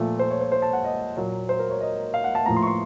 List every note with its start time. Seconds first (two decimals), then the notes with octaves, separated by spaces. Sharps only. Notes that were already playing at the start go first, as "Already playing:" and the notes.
Already playing: A#2 F3 A3
0.19 C5
0.31 C#5
0.41 C5
0.52 C5
0.62 A5
0.73 F#5
0.84 D#5
1.17 A#2 F#3 A#3
1.49 C5
1.59 A#4
1.70 C#5
1.81 D#5
2.14 F5
2.24 F#5
2.35 A5
2.46 A2 F3 A#3 A#5
2.56 C6
2.63 C#6
2.67 C6